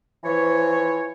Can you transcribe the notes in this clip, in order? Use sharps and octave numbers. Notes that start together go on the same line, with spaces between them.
E3 F3 C#5